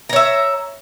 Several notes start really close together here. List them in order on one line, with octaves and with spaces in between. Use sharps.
A#5 C#5 E5